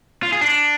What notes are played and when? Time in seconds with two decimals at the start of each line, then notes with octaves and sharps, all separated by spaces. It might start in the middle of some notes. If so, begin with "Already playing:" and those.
0.23 F4
0.32 G#4
0.41 D4